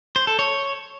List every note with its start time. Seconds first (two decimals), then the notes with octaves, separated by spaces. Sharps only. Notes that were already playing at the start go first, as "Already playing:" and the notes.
0.16 C5
0.27 A4
0.39 C#5